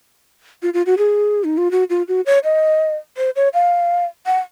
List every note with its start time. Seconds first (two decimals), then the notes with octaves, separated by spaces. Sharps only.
0.63 F4
0.74 F4
0.86 F#4
0.98 G#4
1.44 D#4
1.58 F4
1.71 F#4
1.90 F4
2.08 F#4
2.26 C#5
2.44 D#5
3.17 C5
3.36 C#5
3.54 F5
4.26 F#5